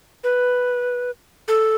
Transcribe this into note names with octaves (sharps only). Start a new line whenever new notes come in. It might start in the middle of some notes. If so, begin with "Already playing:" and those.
B4
A4